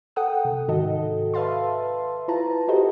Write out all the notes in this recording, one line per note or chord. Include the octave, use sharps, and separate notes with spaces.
A4 F#5 G5 D#6
C3
G#2 D#3 F#4 A4 D#5
B4 E5 F5 A5 C6
E4 F4 B4 A5 A#5
E4 F#4 G4 A4 C5 D#5